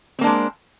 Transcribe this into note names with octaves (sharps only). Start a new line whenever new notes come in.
G#3 A#3 C4 D4